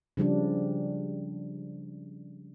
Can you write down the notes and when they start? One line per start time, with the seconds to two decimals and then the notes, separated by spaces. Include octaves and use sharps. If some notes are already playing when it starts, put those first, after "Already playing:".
0.17 C#3 F3 G3 D4